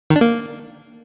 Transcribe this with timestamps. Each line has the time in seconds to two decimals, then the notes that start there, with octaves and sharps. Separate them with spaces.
0.10 D#3
0.16 D4
0.21 A#3